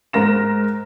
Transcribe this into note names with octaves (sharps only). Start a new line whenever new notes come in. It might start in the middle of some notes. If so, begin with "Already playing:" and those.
G#2 A#4 A#6 E7